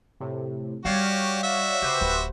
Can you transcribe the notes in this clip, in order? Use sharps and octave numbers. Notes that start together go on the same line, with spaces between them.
A2 C3
G3 F#4 G4 C#5 D5 F5
F#4 E5
C#3 G4 B4 C5
D1